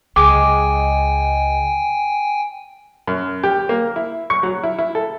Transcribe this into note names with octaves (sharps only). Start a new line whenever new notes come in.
C#2 G#3 G5 G#5 D6
F#2
G4
A#3
E4
C#6
F#3
E4
E4
A4